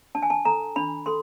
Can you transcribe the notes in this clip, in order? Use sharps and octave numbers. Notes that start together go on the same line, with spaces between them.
D4 A5
G#5
A5
A4 A#5
D4 B5
A4 C6